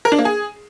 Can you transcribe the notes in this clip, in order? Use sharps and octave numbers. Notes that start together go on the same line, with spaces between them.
A#4
D4
A#3
G#4